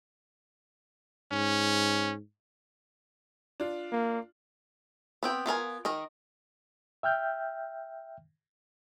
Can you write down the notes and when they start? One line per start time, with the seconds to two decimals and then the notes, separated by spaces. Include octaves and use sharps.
1.32 G#2 C#4
3.60 D4 F4
3.92 A#3
5.23 B3 C4 G5
5.46 B3 F4 A#4 G#5
5.85 D#3 A#4 D#5
7.03 E5 G5 F6 G6